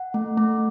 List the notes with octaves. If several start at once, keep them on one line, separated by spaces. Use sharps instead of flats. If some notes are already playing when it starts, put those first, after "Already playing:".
Already playing: F#5
A3
A3